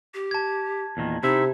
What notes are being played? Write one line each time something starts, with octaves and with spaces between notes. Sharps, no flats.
G4
A5 G#6
E2 A#2 D#3
C3 C4 D#4 E4 E5